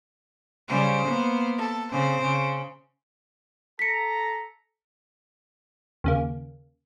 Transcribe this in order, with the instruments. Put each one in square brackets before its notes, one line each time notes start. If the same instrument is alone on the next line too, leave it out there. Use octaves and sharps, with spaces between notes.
[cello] C#3 G3 [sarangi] C5
[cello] A#3 B3
[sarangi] A4
[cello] C#3 C4 [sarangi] C5
[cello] C#3
[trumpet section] A4 A#5 [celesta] B6 C#7
[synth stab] D#2 C#3 A#3